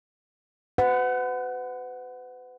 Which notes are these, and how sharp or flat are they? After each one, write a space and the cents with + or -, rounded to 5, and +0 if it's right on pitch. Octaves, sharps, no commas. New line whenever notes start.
B4 +40 F#5 +0